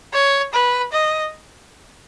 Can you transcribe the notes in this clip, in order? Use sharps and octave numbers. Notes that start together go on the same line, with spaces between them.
C#5
B4
D#5